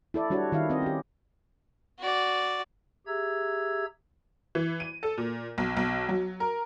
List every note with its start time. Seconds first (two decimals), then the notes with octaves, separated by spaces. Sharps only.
0.14 E4 A4 D5
0.30 G3 D4 F#4 C#5
0.52 D#3 E4 F5
0.70 C4 D#5
0.82 C#4 G4
2.00 F#4 D5
3.07 G4 G#4 E5 A#5 E6 G#6
4.55 E3
4.80 D#7
5.03 A4
5.18 A#2
5.58 B1
5.77 B1
6.09 F#3
6.40 A#4